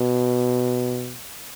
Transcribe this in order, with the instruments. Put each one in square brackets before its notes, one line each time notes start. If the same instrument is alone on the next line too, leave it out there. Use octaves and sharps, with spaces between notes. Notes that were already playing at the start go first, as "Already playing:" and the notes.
Already playing: [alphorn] B2